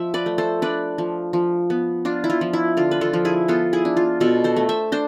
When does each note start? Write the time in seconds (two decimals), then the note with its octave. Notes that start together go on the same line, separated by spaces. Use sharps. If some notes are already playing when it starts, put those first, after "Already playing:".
Already playing: F3 E5
0.14 B4 D5
0.26 A3
0.38 A4 C5
0.62 D4 B4 D5
0.98 F3
1.33 F3
1.70 B3
2.05 D4 F4
2.24 E4
2.30 F4
2.41 F3
2.53 E4
2.77 D3 F4
2.91 B4
3.01 F4 A4
3.13 F3
3.25 E4 G#4
3.48 B3 F4 A4
3.73 E4 G#4
3.85 D4
3.97 F4
4.20 B2 F4 A4
4.44 A4 C5
4.57 A3
4.69 C5 E5
4.92 D4 C5